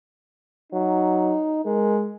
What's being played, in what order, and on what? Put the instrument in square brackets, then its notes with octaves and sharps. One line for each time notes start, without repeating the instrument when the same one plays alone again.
[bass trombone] F#3 [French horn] D#4
[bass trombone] G#3 [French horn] A#4